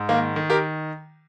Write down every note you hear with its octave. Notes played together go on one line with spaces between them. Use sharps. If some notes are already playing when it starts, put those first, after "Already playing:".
Already playing: G#2
D#3 A#3
D#3
G4 A#4